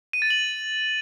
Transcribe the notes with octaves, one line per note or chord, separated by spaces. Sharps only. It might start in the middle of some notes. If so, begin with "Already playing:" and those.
D#7
A6
F#7